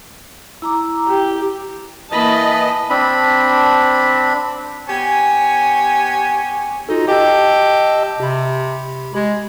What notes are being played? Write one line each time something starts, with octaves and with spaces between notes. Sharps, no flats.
E4 A#5 D6
G4
E3 A#3 D#5 A5 B5
C4 D4 B5
B3 G4 C#5 G#5
D#4 F4 F#4 A4
G4 D#5 A5 E6
C3 G4 B5
G#3